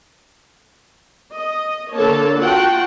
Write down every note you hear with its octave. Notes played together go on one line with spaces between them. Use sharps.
D#5
D3 A#3 A4 C#5 A5
F4 F#4 F#5 G5 A5